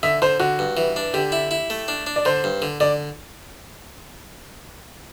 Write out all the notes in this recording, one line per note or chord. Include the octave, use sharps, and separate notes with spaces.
D3 E5
D3 C5
D3 F#4
G2
E3
D4
D3 G4
E4
E4
A3
D4
D4
D5
D3 C5
G2
D3
D3 D5